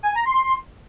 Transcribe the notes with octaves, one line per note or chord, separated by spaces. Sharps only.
G#5
A#5
C6